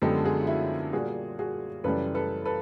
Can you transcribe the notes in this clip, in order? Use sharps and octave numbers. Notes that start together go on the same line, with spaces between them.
F#2 D3 F3 G#3 B3 G4 A4
F#4 G#4
F4
E4 F#4
A#2 G3 A#3 F#4 G#4
F#4 G#4
F#2 C#3 E3 G3 A4 B4
A4 B4
A4 B4